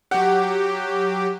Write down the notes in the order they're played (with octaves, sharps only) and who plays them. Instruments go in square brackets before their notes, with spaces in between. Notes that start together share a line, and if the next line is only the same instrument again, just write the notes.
[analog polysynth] F#3 G4 [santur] F#5